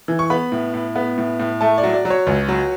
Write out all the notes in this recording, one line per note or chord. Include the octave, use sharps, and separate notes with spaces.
E3
C#6
B3 B5
A2
A2
B3
A2
A2
A3 A5
D5
F#3
D5
F#3
C#5
C#2
F#3